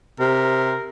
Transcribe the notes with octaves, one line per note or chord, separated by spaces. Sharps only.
C3 A#4